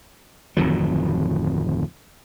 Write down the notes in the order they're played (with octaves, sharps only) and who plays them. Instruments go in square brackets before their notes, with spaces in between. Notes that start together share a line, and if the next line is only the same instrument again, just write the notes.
[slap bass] D1 F2 D#3 F#3